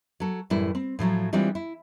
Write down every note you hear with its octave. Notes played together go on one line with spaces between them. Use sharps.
F#3 A4
F#2 A2 E3 G3 E4
C4
A2 F3 F#3 F4
E3 G3 G#3 C4 D4 F4
E4